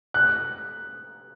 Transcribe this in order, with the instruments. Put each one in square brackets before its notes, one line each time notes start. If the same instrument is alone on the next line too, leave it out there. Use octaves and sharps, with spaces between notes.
[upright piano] F#6